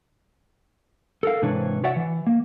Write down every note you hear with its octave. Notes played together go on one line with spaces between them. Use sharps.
A4 A#4 F5
G#2 C3 E3 D4 B4 C#5
F#4 C#5 D5 E5 F#5
E3
A#3